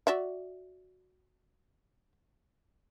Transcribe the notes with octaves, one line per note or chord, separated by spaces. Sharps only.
F#4 D5 E5